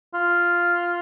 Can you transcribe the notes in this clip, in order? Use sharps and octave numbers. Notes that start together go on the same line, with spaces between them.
F4